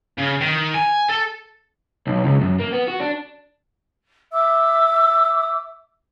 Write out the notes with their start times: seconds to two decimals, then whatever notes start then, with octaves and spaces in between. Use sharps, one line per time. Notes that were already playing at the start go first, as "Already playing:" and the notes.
0.18 C#3
0.41 D#3
0.74 G#5
1.09 A4
2.07 B1
2.24 C#2
2.41 F#2
2.59 A#3
2.73 B3
2.88 F#4
3.00 D4
4.33 E5 D6 E6